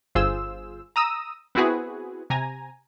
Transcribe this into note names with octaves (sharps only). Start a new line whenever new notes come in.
G1 F4 G#4 C5 E6
A#5 D#6 E6
B3 C4 E4 F#4 G#4 B4
C3 G#5 A#5